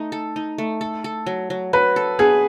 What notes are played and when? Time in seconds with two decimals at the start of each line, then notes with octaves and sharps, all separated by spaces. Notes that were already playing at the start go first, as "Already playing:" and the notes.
Already playing: A3 D#4
0.12 A4
0.36 D#4
0.58 A3
0.81 A4
1.04 A4
1.26 F#3
1.50 F#3
1.73 F#3 B4
1.96 A4
2.19 B3 G#4